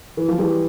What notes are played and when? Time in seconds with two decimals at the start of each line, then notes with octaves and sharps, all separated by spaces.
0.17 E3
0.29 F3
0.39 E3 G3